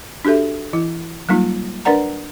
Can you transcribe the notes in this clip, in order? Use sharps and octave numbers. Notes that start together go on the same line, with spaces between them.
D4 F#4 G4 A4 E5
E3 E4
F#3 G3 A#3 D#4 F4
D4 A#4 B4 D5 F#5 A#5